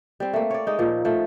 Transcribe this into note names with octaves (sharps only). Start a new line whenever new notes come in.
G3 C4
A3 A#3
C#5 D5
G#3 D#4
A#2 F3
F3 A3